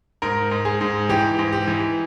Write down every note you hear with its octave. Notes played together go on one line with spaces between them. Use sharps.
G#2 A#4
G#2
G#4
G#2
E3 G4
G#2
G4
E3